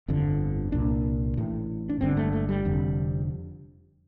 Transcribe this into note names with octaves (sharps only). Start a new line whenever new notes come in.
G1 F2 D3
C2 A#2 D4
A1 A2
D4
G1 G2 D3 C4
A3
A3
G3
F1 F2 D3